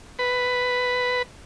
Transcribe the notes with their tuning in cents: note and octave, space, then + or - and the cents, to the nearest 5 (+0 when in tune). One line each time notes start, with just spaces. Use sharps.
B4 +5